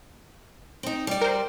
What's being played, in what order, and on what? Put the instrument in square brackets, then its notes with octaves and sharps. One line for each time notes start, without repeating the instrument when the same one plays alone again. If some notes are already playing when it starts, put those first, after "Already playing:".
[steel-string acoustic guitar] C4 D#4
G3 D5
[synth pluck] A#4 C5